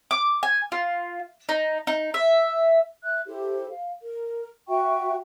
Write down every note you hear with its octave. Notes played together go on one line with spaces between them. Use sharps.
D6
G#5
F4
D#4
D#4
E5
E5 F#6
E4 G4 A4 C5
F5
A#4
F#4 E5 G5 C#6